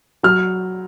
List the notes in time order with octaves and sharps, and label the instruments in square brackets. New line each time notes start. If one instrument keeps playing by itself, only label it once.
[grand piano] F#3 F6